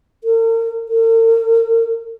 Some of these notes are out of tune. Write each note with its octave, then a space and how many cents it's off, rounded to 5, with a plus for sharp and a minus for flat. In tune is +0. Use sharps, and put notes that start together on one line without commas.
A#4 -40
A#4 -45